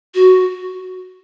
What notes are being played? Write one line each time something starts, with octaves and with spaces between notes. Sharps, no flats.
F#4